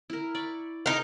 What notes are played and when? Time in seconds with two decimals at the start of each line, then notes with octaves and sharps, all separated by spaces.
0.10 E4 A#4
0.35 D5 B5 C#6
0.86 D#4 G#4 A#4 D#5